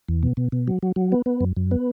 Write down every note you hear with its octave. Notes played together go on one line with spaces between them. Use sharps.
E2
B2
B2
B2
F#3
F#3
F#3
B3
B3
F#2
F#2
B3